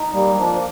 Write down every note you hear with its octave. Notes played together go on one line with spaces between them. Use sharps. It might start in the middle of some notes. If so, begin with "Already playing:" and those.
Already playing: D#4
G3 A#3
F3 D4